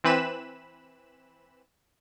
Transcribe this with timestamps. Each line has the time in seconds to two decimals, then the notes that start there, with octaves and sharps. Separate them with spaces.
0.04 E3 C4 B4 B5 E7